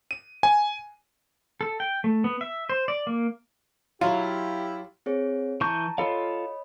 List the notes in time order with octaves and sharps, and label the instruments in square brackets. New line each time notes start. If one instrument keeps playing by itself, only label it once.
[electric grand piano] D#7
G#5
[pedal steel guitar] A4
G5
A3
B3
E5
C5
D5
A#3
[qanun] F#3 [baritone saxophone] E4 [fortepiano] F4 [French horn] G4
[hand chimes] C4 G#4 C#5
[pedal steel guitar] E3 C#6 G6 [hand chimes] A5 A#5
[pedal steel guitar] F4 A4 F5 [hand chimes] C#5 D#5 B5